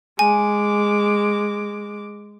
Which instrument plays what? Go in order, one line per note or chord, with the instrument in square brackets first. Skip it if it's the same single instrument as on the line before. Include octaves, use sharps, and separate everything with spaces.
[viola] G#3 D6 [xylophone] G#5